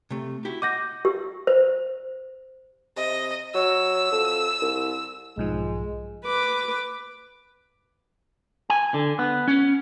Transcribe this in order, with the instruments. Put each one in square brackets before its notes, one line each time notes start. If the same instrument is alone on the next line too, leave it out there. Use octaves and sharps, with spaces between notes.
[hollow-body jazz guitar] C3 A3
E4 F#4 G4
[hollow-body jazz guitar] D#5 F#5 [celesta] D6 G6 A#6
[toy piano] G4
C5
[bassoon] C3 [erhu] D#5
[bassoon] F#3 [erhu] E6
[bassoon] F2
C2
[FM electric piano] B1 G#2 F3 [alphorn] G#3
[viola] B4 D6
[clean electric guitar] G#5
D3
B3
C#4